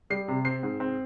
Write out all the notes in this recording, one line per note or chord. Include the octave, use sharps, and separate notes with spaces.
G3 C7
C3
C4 C7
G#2
C4